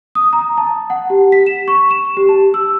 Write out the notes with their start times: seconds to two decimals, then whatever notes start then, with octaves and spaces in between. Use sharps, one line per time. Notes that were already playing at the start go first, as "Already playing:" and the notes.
0.15 D#6
0.33 A#5
0.57 A5
0.90 F#5
1.10 G4
1.32 B6
1.46 E7
1.68 C#6
1.91 E7
2.17 G4
2.29 A5
2.54 E6